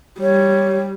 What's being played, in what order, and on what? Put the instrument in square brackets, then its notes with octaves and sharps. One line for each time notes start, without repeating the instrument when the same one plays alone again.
[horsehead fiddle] G3 [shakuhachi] C#5